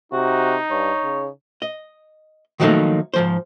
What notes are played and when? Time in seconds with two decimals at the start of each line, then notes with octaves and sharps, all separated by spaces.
0.12 C3 D#4 F#4
0.71 G2 C#5
1.03 C#3
1.62 D#5
2.60 D#3 F3 F#3 A3 A#3 D#4
3.14 G#2 F3 C5